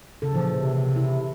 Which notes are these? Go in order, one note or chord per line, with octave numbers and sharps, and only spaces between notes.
C#3 A4
A#2 E3 F3
C3
E4